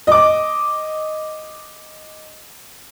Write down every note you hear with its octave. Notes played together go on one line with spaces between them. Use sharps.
D#5 D6